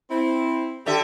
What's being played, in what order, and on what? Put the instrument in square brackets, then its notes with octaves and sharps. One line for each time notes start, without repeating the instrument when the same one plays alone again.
[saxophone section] C4 E4
[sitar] D3 A4 E5 [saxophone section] G4